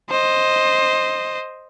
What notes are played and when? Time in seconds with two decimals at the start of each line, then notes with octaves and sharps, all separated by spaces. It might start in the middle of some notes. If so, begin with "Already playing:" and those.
0.10 C5 D#5